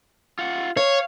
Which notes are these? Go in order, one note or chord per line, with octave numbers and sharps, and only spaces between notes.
F4 F#5
C#5 F5